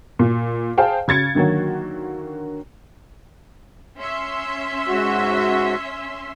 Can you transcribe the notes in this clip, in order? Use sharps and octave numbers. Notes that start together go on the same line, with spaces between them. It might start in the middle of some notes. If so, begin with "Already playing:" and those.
A#2
G#4 C5 F5 G5 A5
C#3 G#6 A6 C#7
D3 D#3 F#3 A#3 F#4
C#4 E5 C6
G#2 F#4